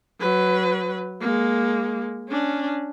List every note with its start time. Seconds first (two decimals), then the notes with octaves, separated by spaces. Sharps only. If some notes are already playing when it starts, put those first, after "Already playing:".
0.20 F#3 B4
1.21 G#3 A#3
2.29 C#4 D4